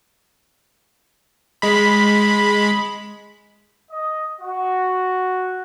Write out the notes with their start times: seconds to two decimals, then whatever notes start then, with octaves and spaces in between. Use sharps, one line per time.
1.62 G#3 B5
3.90 D#5
4.41 F#4